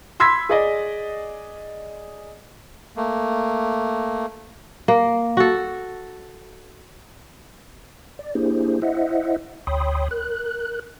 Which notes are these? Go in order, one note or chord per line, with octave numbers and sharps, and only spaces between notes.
B5 C6 E6 G#6 B6
G#4 D5 D#5
A3 A#3
A#3
F#4 A4
D5
A#3 D4 E4 G4 G#4 C5
E4 C5 D#5 E5 F#5
D2 C#5 G5 B5 C6 D#6
A#4 F#6